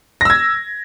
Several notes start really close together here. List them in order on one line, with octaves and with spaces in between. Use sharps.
A#6 E6 G#6